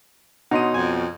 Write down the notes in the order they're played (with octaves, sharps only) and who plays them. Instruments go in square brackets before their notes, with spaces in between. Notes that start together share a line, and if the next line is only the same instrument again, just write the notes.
[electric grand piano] B2 C#5 D#7 [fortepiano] D#4 [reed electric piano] F#5 C6
[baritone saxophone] F2 [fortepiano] G#5